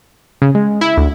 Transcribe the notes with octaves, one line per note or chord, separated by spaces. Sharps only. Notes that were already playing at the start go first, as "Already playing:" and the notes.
C#3
G#3
E4
D2